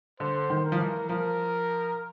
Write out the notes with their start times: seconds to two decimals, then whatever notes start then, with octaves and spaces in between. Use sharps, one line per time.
0.20 D3 C5
0.50 D#3
0.65 A#4
0.72 F3
0.80 E3
1.09 F3 A#4